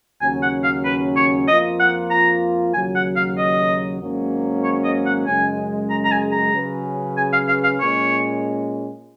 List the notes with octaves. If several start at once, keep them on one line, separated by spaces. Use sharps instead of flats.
D#2 C#3 F#3 C#4 G#5
F#5
F5
B4
C#5
F2 F3 A#3 F4 D#5
F#5
A#5
D#2 C#3 F#3 G#5
F#5
F5
D#5
G#1 G#2 F#3 A#3 C#4
C#5
D#5
F#5
F#2 C#3 G#3 G#5
A#5
A#5
G#5
A#5
C#3 F#3 C#4 G#4 B4
G#5
F5
F5
F5
A#2 G#3 C#4 C#5